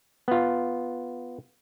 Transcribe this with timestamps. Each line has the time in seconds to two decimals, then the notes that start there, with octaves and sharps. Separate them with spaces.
0.28 B3 F4